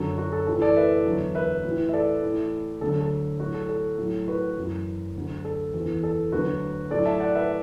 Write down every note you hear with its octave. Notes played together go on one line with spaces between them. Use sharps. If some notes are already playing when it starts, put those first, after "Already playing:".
Already playing: F#2 D3 F#3 A4
F#4
A4
A2 E3 A4
A4 D5
B4 E5
E2 D3 F#3
B4 E5
A2 E3
E5
A4 D5
A2 E3
D2 D3 F#3 A4
A4
A2 F#3 F#4
A4
A4
A2 F#3
F#4 B4
F#2 E3
D2 D3 F#3
A4
E2 E3
A4
D2 D3 F#3 F#4 B4
A2 F#3 A4 D5
E5 A5
D5 F#5
B4 E5